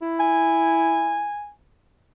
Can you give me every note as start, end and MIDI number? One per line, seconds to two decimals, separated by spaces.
0.02 1.30 64
0.20 1.50 80